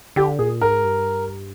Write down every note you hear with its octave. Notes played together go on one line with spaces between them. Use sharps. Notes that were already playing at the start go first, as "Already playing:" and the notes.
D3 G4
A#2 G#4
G#2 A#4
G2